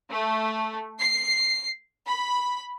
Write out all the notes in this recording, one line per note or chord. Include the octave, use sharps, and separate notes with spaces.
A3
C7
B5